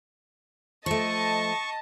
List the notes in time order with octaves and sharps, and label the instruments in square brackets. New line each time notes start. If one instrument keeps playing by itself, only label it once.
[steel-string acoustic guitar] F3 A3 [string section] D#5 A5 [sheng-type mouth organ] C#6